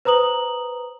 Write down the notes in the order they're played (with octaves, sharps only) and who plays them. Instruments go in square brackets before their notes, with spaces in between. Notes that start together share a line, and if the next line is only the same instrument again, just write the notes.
[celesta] B4 C5 A#5 D#6 F#7